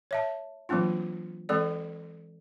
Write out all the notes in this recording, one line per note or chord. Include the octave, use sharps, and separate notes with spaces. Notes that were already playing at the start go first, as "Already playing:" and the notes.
C#5 E5 A5
E3 F#3 A#3 C4 D4 F4
E3 G#3 C4 A4 D5